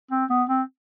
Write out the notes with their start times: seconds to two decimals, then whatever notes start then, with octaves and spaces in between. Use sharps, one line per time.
0.11 C4
0.30 B3
0.49 C4